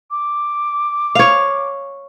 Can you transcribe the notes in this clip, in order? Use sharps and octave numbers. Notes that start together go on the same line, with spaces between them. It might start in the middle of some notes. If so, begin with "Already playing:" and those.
D6
C#5 F5